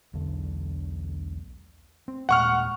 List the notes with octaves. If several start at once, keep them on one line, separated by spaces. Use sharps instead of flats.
B1 E2 D3
C4
D#1 A#2 G#3 F#5 C#6 F6